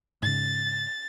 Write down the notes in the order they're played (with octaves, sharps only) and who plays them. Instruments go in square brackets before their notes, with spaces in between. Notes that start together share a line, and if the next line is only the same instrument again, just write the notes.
[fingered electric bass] G#2 C#3 [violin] A6